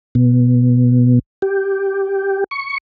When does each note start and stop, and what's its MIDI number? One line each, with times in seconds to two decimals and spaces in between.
0.15 1.19 47
1.42 2.44 67
2.51 2.78 85